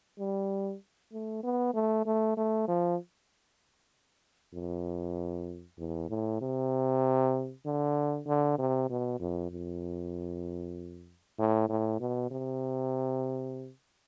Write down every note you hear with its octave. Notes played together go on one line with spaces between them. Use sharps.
G3
A3
B3
A3
A3
A3
F3
F2
E2
A2
C3
D3
D3
C3
B2
F2
F2
A2
A2
B2
C3